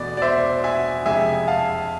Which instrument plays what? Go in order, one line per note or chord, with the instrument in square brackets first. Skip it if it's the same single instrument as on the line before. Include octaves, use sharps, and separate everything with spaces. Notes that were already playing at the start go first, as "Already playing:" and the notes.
Already playing: [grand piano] E2 B2 A3 D5
D5
C5 E5
E5 G#5
F2 C3 G#3 E5 G#5
F5 A5